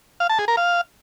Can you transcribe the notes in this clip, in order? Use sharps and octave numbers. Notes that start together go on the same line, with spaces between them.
F5
A5
G#4
A#4
F5